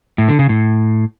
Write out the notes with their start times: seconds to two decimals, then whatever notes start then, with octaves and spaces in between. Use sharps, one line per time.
0.18 A2
0.29 D3
0.39 C#3
0.49 A2